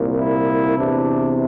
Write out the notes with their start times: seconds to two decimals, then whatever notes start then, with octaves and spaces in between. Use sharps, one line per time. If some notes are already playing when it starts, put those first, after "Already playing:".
Already playing: C2 A#2
0.17 E4
0.77 E2 C3 E3 D4